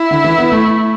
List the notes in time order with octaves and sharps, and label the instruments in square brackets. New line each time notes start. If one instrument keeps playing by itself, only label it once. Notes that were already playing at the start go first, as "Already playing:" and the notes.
Already playing: [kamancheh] E4
[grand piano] D3
E3
B3
A3